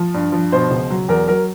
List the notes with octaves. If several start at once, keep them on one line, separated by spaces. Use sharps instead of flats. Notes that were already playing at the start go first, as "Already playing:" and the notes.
Already playing: F3
G2
F3
B2 C5
C#2
F#3
E2 A#4
F#3 A#4